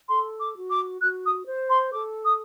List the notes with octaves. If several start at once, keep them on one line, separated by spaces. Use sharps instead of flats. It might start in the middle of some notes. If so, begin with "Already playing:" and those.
A4 C6
D6
F#4
D6
F#4 F#6
D#6
C5
C6
A4 D6
D#6